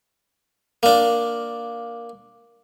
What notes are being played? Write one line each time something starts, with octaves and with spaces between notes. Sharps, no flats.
A#3 D4